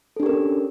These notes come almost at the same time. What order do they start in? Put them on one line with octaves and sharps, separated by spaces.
A4 D4 G4 A#4 C#4